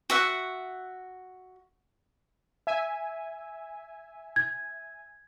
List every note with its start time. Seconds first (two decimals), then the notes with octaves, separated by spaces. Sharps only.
0.10 F#4 E5 F#5
2.67 E5 G#5
4.36 G#6